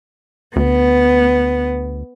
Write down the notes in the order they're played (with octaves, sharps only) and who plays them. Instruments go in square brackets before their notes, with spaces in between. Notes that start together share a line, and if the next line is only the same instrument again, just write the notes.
[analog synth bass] D2 [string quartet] B3